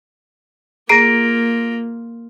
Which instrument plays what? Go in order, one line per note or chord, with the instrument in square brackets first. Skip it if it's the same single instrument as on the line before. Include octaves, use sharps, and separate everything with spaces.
[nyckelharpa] A#3 F4 [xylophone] G#4 A#5 C7 [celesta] A#6 D7